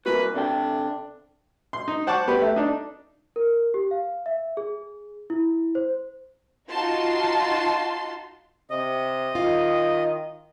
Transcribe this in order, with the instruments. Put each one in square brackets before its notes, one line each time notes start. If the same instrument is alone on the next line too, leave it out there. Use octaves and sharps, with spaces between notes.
[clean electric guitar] C2 A#3 F#4 [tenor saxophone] B4
[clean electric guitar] C3 A4 G5 [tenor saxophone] D4
[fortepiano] C6
D#4
C5 F#5 A5 C#6 D6
B3 G4 B4
A3
D4 D#4
[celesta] A#4
G4
F5
E5
G#4
E4
C5
[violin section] D#4 F4 F#4 A5 C6
[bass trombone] C3 [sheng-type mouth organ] D#5
[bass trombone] D#3 [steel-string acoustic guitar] F4